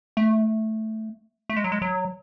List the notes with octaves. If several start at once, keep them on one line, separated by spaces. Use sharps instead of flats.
A3
A3
G#3
F#3
G#3
F#3